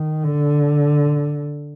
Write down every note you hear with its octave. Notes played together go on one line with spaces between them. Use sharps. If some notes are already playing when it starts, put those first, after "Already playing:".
Already playing: D#3
D3